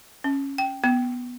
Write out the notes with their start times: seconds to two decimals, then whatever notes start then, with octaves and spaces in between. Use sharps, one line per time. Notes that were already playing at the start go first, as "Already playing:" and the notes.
0.24 C#4
0.58 G5
0.84 B3